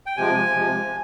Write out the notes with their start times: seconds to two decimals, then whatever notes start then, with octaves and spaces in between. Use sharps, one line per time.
0.06 G5
0.17 C3 F3 G#3 G#5
0.55 C3 F3 G#3